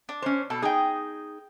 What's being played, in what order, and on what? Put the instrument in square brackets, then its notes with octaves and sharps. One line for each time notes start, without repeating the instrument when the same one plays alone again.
[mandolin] D4
[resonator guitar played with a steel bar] C#4 C5
[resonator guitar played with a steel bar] B2 [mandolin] A4
[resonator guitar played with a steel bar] D#4 G#4 [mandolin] G5 D#6